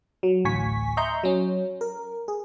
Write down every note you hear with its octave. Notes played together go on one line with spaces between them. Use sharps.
F#3
A1 D2 A2 G#5 C#6 B6
D#5 E5 A#5 C6 C#6 G6
F#3 C#4
A#4
G#4